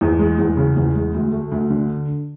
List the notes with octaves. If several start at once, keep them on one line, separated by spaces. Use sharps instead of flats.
E2
G#3
E2
C#3
E2
G#3
D2
A3
D2
D3